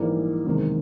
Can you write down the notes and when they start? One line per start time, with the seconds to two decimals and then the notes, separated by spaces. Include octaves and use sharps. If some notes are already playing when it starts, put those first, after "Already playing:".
Already playing: A#1 G#2 E3 G3 A#3
0.45 F#1 E2 C3 D#3 G#3